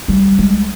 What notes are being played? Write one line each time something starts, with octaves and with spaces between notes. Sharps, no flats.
G3
G#3